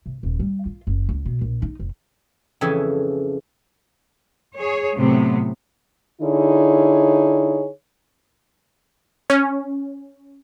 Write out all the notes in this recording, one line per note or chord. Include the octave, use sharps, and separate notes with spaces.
C3
D#1
G3
F4
F#1
C#2
B2
A#1
D#4
F1
F2 C#3 E3 A4 E5 G#5
G#4 C#5
A2 C3 F#3 B3
D3 D#4 E4 G#4 C#5
C#4